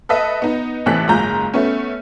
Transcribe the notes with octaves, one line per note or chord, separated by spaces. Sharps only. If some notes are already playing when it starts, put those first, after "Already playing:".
A4 B4 D#5 E5
B3 D#4
A1 C3 E3 A4 F#6 B6
F#1 G#2 F4 A#5 G6
A3 B3 C#4